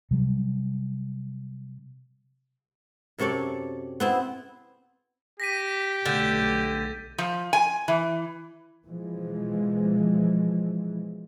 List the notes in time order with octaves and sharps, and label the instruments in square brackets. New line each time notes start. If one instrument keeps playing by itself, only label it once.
[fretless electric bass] C3 F#3 G3
[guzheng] F#2 C3 A4 C#5 D5
B3 C4 E4
[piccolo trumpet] G4 [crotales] A#6 B6 D#7
[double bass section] B1 A3 [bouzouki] D3 [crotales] G6 A6
[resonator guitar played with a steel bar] F3
G#5
E3
[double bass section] B2 E3 F3 G#3